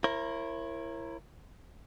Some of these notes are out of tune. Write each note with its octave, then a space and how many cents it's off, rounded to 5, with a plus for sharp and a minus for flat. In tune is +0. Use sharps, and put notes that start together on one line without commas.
E4 +20 A#4 +0 C#5 -35